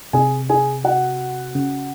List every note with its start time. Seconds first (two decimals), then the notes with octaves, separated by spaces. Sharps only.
0.13 C3 G#4 G#5
0.50 G#4 G#5
0.84 F#4 F#5
1.55 C#3